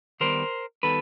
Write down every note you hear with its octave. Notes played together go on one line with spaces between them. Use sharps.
D#3 G3 B3 A#4 C5
D#3 G3 B3 A4 B4